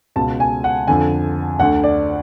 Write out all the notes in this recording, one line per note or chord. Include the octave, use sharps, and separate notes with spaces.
C#2 B2 A5
G#5
F#5
F2 D3 G#5
D2 D3 F#5
D5